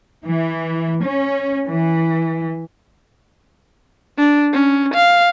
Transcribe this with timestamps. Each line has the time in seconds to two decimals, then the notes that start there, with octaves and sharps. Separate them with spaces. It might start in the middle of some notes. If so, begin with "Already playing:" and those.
0.25 E3
1.04 C#4
1.68 E3
4.18 D4
4.53 C#4
4.94 F5